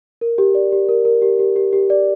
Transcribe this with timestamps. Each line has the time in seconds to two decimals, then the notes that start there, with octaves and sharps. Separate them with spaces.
0.21 A#4
0.38 G4
0.55 D5
0.72 G4
0.89 A#4
1.05 A#4
1.22 G4
1.39 G4
1.56 G4
1.73 G4
1.90 D5